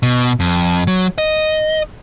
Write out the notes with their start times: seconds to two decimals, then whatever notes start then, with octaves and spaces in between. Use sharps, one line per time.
0.03 B2
0.40 F2
0.87 F#3
1.18 D#5